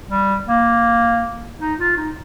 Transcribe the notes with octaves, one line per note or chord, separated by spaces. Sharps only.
G3
A#3
D#4
F4
D#4